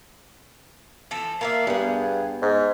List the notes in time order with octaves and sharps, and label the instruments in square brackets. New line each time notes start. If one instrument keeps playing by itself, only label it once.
[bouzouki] E3 F3 A4
[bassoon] A#3 [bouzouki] F4 D5 E5
[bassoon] G2 [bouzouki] B3 G#4
[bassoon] G#2